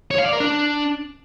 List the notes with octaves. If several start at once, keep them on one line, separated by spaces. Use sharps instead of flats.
C#5
F5
D5
A#4
D4